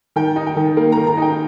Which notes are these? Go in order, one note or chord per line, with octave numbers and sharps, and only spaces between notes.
D#3 G5
D#4
G5
D#3
A#3
D#3 A#5
A#5
D#4 G5